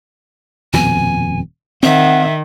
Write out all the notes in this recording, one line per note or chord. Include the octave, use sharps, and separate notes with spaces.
D#1 F2 B2 G#5
D#3 C4 E5 F#5